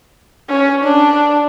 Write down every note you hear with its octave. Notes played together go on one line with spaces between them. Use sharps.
C#4
D4